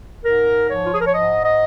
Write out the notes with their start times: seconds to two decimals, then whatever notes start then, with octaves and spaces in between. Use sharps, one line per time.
0.23 G#2 A#4
0.68 F3 C#5
0.84 F4
0.92 G#4
0.99 A#4
1.06 C#5
1.13 G#2 D#5
1.44 D#5